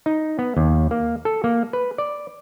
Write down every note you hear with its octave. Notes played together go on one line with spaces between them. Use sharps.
D#4
B3
D#2
A#3
A4
A#3
B4
D5